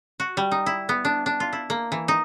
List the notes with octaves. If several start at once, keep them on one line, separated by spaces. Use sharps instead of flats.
F#4
G3
D#4
E4
B3
D4
D4
F4
E4
A#3
E3
D#4